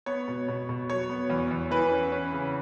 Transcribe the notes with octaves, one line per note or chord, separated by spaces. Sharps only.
B3 C#5
B2
B2
B2
F#3 C#5
B3
E2
E2
E3 B4
C#4
C#4
C#3